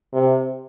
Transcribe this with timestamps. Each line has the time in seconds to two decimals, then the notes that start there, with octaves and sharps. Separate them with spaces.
0.13 C3